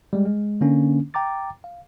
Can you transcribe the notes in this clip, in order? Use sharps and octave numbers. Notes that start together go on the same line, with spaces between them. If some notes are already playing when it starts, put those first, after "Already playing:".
G3 G#3
G#3
D3 A#3 C#4 D4
G5 A#5 D6 A6
F5